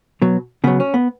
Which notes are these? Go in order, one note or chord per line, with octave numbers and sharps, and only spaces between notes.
B2 F#3
C#3 F#3 B3
C#4
B3